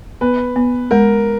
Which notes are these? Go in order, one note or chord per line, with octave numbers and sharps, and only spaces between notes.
B3 B4
B3
G#3 A#4